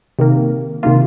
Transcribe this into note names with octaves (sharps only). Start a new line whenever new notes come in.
C3 D#3 A#3
C3 D#3 A#3 F4